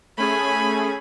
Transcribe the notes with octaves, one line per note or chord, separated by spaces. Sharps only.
A3 C#4 G#4 G#5 B5